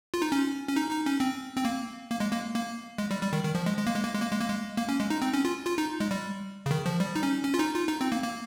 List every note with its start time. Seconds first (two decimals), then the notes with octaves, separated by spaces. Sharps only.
0.14 F4
0.22 D#4
0.32 C#4
0.68 C#4
0.76 D#4
0.91 D#4
1.06 C#4
1.20 C4
1.57 C4
1.65 A#3
2.10 A#3
2.20 G#3
2.33 A#3
2.55 A#3
2.98 G#3
3.11 G3
3.22 G3
3.33 D#3
3.44 D#3
3.55 F3
3.66 G#3
3.77 G#3
3.87 A#3
3.95 G#3
4.04 A#3
4.14 G#3
4.22 A#3
4.31 G#3
4.41 A#3
4.49 G#3
4.77 A#3
4.89 C#4
5.00 G#3
5.10 D#4
5.22 C4
5.34 C#4
5.45 F4
5.66 F4
5.78 D#4
6.00 G#3
6.11 G3
6.66 C#3
6.71 D#3
6.86 F3
7.00 G3
7.15 D#4
7.23 C#4
7.44 C#4
7.54 F4
7.59 D#4
7.74 F4
7.89 D#4
8.01 C4
8.12 A#3
8.23 A#3